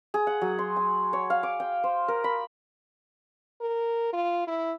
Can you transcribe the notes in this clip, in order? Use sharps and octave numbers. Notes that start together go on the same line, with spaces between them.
G#4
F#5
F#3
C6
G#5
C#5
F5
D6
G5
C5
A#4
B5
A#4
F4
E4